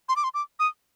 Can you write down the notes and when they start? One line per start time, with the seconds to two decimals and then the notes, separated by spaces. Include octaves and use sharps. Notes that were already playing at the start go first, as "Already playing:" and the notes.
0.09 C6
0.16 D6
0.24 C6
0.34 D6
0.59 D#6